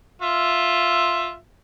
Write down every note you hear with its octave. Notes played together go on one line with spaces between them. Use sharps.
F4 E5